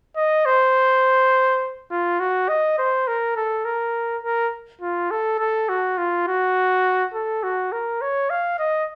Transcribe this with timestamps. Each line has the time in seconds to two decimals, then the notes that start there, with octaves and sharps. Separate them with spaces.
0.17 D#5
0.46 C5
1.91 F4
2.20 F#4
2.49 D#5
2.79 C5
3.08 A#4
3.36 A4
3.65 A#4
4.23 A#4
4.81 F4
5.11 A4
5.39 A4
5.69 F#4
5.98 F4
6.27 F#4
7.14 A4
7.43 F#4
7.72 A#4
8.02 C#5
8.30 F5
8.59 D#5